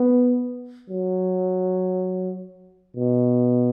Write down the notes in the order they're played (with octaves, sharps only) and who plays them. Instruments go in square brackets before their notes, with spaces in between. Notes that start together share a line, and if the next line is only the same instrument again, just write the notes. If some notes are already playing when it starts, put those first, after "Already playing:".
Already playing: [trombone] B3
F#3
B2